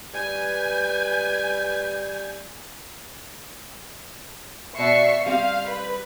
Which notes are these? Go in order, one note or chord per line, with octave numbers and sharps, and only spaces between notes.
G3 B4 G#5 G6
B2 D5 E5 F#5 C#6 C7
G3 C4 G4 F5
B4